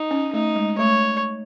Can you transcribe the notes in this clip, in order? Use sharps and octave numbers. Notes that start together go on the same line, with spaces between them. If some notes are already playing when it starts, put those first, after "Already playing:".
Already playing: D#4
C#4
A3 D#4
G#3
A3 C#5